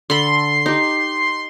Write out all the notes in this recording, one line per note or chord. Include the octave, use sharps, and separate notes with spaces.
D3 A4 B5 C6
D#4 G4